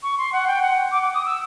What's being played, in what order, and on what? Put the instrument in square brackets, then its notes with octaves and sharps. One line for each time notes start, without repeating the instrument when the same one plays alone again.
[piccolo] C#6
C6
F#5
G5
F#5
D6
D6
D#6
E6